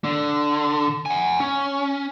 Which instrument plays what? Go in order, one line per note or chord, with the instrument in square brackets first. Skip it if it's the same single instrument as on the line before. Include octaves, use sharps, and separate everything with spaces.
[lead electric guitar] D3
F#5 G#5
C#4